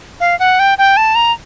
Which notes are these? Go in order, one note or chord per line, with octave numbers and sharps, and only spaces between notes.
F5
F#5
G5
G5
A5
A#5